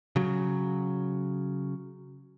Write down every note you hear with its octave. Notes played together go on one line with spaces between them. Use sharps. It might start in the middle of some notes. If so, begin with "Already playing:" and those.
C#3 F#3